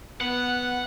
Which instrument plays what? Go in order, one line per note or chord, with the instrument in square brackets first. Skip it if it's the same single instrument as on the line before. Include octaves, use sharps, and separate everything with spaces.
[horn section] B3 [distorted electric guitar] F#5